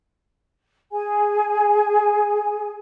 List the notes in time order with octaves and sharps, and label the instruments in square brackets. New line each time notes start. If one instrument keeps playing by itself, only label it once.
[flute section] G#4 G#5